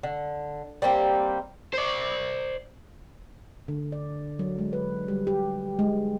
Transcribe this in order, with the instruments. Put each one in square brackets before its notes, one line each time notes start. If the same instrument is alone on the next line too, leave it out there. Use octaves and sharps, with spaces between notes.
[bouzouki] D3
G3 A#3 C4 G4
[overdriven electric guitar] C5 D5
[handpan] D3
D5
F#3
G#3
B4
G3
G4
G#3